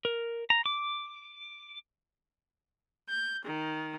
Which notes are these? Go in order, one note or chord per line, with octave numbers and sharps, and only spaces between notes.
A#4
A#5
D6
G6
D#3